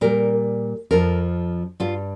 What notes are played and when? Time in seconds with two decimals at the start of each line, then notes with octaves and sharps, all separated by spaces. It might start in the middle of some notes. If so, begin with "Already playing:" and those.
0.01 A#2 G3 A#4
0.91 F2 F3 A#4
1.80 G2 G3 F4